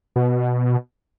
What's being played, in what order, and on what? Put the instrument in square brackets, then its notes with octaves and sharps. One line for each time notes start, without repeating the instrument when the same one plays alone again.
[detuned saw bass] B2